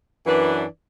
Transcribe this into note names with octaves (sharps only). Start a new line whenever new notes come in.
F#2 E3 D4 B4 D5